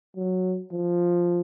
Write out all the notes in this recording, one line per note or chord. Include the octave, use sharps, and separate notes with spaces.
F#3
F3